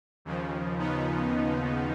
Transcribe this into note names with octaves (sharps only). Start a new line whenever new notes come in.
D#2 C#3 F3
B3 D#4